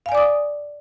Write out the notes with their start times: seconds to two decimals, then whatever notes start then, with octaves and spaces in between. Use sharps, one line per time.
0.06 F5
0.09 G#5
0.12 D5
0.15 D6
0.18 D#6